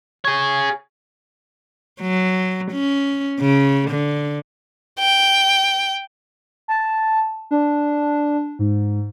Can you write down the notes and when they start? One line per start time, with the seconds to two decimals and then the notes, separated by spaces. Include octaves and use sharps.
0.25 G#4 C#5
2.01 F#3
2.71 C#4
3.40 C#3
3.90 D3
4.99 G5
6.68 A5
7.51 D4
8.59 G#2